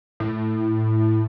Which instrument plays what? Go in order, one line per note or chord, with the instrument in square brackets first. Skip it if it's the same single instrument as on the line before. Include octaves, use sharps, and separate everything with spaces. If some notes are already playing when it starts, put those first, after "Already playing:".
[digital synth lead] A2